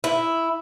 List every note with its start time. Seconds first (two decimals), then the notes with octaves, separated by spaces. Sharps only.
0.04 E4